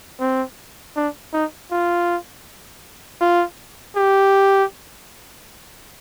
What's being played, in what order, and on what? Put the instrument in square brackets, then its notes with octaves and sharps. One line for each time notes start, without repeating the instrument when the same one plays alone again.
[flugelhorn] C4
D4
D#4
F4
F4
G4